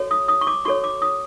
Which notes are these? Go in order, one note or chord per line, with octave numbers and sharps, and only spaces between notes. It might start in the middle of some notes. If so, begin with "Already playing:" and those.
Already playing: F#4 A4 C#5
D#6
D#6
C#6
D6
F#4 A4 C#5 C#6
D6
D#6